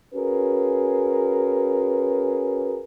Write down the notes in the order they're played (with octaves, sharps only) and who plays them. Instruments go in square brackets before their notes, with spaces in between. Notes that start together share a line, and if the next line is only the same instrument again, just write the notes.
[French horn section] C#4 F#4 G#4 A#4 B4